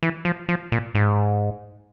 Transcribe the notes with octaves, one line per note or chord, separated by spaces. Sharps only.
E3
F3
F3
A#2
G#2